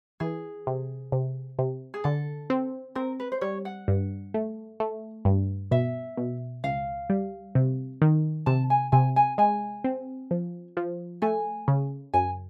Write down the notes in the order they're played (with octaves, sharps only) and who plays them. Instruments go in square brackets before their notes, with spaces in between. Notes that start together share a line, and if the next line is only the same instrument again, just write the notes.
[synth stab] E3 [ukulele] G#4
[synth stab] C3
C3
C3
[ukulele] G#4
[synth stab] D3 [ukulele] A4
[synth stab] C4
[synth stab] C4 [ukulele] A#4
[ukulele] B4
C5
[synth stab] G3 [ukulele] C#5
[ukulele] F#5
[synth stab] G2
A3
A3
G2
[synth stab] B2 [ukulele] E5
[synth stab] B2
[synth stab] C#2 [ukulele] F5
[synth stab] G3
C3
D#3
[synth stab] C3 [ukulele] A5
[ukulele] G#5
[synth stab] C3 [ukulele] G#5
[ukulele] G#5
[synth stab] G#3 [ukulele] G#5
[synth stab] C4
F3
F3
[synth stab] A3 [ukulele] G#5
[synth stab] C#3
[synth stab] F#2 [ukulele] G#5